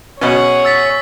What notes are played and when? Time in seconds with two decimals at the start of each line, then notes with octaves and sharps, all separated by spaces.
0.21 B2 C#4 G#4 C#5 F#5
0.65 E6 A6 B6